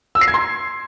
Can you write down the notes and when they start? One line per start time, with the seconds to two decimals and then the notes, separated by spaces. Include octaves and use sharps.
0.15 E6
0.21 C7
0.28 G#6
0.34 C6